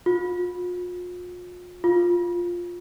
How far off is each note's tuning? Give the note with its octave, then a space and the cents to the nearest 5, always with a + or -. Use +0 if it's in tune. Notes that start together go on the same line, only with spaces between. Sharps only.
F4 +40
F4 +5